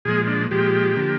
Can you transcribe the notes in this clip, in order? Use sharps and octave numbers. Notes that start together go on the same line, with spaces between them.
A#2 F3 G#3 G#4
D4
A#2 F3 G#3 G4
D3 F3 A#3